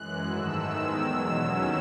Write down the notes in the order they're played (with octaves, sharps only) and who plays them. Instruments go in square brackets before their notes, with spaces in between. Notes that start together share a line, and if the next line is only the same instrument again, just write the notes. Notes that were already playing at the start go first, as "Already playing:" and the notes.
Already playing: [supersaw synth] F#2 E3 G#3 F#6
G#2 D#3 A3 E6
E2 D#3 G#3
E2 B2 F#3
D#2 D#3 F#3 C#4 E6